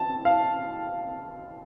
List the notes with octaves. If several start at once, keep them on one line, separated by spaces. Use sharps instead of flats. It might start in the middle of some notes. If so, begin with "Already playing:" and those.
Already playing: A5
F5